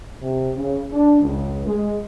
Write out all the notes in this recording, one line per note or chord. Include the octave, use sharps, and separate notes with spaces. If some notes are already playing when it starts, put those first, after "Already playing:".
C3
C#3
D4
C#2
G#3